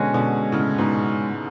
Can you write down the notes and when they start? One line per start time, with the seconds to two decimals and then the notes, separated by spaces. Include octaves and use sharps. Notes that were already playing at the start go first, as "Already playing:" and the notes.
Already playing: B2 D3 G#3 C#4 F#4
0.14 B2 D3
0.52 A2 C#3
0.78 G#2 B2